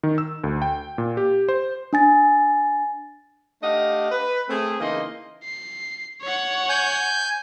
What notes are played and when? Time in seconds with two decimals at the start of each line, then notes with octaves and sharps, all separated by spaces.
0.03 D#3
0.18 E6
0.44 D2
0.62 G5
0.98 A#2
1.17 G4
1.49 C5
1.93 D4 G#5 A6
3.62 A3 D4 G4 D#5 F5 F#5
4.11 B4
4.49 A3 C4 G#4
4.80 C#3 E3 A#3 D#4 D#5 C6
5.44 C7
6.23 C#5 F#5
6.69 G#5 G6